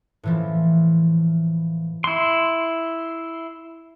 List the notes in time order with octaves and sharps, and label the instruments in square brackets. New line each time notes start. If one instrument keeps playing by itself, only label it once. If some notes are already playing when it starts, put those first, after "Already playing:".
[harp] A2 E3 F3
[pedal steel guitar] E4 C6